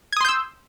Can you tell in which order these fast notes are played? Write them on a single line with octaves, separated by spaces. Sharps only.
G#6 D#6 C6 G6 E6